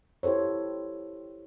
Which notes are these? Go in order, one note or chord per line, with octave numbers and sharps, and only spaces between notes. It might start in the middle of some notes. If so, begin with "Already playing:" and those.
E4 G4 A4 C5 C#5